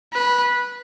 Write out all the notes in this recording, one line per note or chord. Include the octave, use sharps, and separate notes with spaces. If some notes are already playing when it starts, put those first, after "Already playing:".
B4